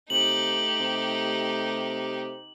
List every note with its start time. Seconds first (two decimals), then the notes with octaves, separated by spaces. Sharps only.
0.10 C3 A3 D#4 G4 F#7
0.80 C3